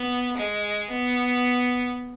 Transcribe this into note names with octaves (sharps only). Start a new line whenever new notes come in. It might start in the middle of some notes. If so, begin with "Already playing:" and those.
Already playing: B3
G#3
B3